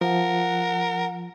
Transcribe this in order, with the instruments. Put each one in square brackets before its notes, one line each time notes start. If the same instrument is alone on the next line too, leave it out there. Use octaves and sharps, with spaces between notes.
[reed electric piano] F3 [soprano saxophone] A#4 [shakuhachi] F#5